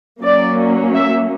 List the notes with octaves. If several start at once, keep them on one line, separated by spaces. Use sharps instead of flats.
F#3 A#3 C#4 D5
E5